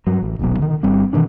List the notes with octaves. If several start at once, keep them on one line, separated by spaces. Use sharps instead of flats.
G2 F#3
A1
D#1 B1 B2 F#3
D3 D#3
G1 G2 G3 C4
B2 D#3 E3 D4